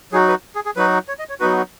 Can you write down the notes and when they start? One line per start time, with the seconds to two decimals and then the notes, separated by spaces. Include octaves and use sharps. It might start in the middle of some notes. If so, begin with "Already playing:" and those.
0.12 F#3 D#4 F#4 G#4
0.28 B4
0.55 G#4
0.66 G#4
0.76 F#3 D#4 F#4 B4
1.08 C#5
1.19 D#5
1.29 C#5
1.40 F#3 B3 D#4 F#4 B4
1.57 F#4